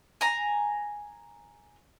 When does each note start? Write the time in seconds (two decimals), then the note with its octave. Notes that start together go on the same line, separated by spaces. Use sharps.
0.21 G#5 A#5